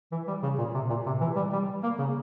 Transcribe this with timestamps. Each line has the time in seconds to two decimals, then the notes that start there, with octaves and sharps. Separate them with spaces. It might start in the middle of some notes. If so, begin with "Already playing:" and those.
0.12 E3
0.27 G3
0.43 C#3
0.58 A#2
0.74 C3
0.89 A#2
1.06 C3
1.21 E3
1.36 G3
1.53 G3
1.83 A#3
1.98 C#3